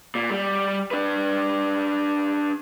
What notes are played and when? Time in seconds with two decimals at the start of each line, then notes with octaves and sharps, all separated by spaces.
0.15 A#2
0.30 G3
0.91 D4 B4